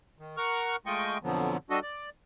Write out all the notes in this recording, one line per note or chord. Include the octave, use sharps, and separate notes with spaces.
D#3
A#4 F#5 C#6 F6
G#3 A3 F4 D#5 G5 C#6
F2 B2 D3 F3 F#3 B3
G3 D4 F#4 A4 D#5
D5